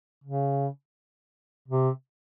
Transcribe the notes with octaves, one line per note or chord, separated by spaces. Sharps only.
C#3
C3